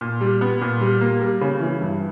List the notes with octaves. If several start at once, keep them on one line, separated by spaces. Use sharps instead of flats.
A#2
G3
B3
A#2
G3
A#3
G3
C#3
E3
G2